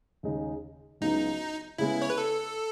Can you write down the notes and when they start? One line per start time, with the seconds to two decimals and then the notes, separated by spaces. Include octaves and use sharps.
0.23 D#2 C#3 G#3 D#4
1.01 C#2 C#3 F#3 B3 D#4 E4
1.78 C#3 G#3 B3 E4
2.02 C#5
2.10 B4
2.18 A4